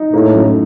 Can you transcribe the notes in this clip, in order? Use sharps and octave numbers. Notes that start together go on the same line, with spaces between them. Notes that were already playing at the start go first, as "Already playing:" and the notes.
Already playing: D#4
A2 A#3
F#2